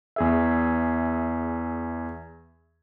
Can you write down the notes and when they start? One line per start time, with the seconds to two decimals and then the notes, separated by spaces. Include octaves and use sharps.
0.16 E2 G#4 E5